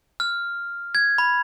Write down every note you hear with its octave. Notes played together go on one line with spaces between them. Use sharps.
F6
G#6
B5